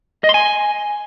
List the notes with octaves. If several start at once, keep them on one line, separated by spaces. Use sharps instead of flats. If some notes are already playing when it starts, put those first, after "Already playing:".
D#5
C6
G#5